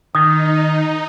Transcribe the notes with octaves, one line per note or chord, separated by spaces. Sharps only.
D#3 D#4 D#6